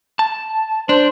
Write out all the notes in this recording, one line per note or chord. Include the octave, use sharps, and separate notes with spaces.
A5
D4 C5